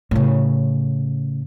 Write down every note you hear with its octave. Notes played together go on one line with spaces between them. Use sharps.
A2 C#3